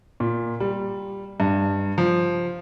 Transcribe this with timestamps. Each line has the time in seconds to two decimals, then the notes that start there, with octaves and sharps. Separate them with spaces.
0.20 A#2
0.60 G3
1.40 G2
1.98 F3